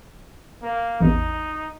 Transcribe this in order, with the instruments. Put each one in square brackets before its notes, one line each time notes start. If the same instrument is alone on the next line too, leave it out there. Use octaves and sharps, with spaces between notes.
[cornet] A#3
[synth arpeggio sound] A1 E2 [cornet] D#4